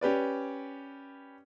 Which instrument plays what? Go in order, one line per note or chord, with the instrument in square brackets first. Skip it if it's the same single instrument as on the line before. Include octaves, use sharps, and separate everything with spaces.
[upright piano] C#4 G4 B4 D5